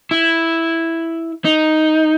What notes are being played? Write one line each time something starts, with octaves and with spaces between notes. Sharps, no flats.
E4
D#4